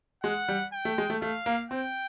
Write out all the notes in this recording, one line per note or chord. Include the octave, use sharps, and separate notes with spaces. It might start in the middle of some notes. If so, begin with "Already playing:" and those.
G#3 F#5
G3
G5
A3
G#3
A3
A3 F5
A#3
C4 G5